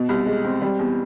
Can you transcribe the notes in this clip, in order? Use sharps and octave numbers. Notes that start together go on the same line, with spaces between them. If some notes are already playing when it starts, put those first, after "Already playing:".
Already playing: B2
C2
G#3
C4
G3
E2